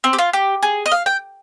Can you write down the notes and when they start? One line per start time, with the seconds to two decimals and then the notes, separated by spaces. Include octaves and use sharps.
0.04 C4
0.13 G4
0.19 F4
0.33 G4
0.63 G#4
0.86 D#5
0.92 F5
1.06 G5